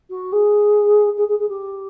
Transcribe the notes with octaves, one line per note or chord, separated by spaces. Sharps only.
F#4
G#4
G#4
G#4
G#4
G4